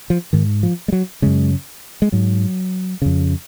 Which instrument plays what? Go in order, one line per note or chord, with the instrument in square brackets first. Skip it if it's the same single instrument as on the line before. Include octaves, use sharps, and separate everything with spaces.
[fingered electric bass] F3
G#2 D#3
F3
G#3
F#3
F#2 C#3 G#3
G#3
G#2 F#3
F2 C#3